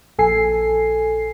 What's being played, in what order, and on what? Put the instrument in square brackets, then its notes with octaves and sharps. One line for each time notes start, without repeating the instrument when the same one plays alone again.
[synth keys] A#1 A4 G#5 C7